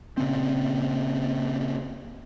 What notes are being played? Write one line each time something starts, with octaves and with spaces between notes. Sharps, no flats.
A#2 C#3 C4